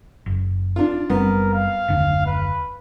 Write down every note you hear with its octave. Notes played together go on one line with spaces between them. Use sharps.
F#1
D4 F4
F#1 G3 B3 C4 A#4
F5
F#1 D#2 D3
B4